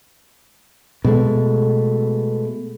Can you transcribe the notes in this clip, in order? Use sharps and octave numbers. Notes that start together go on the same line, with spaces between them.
B2 G#3 A3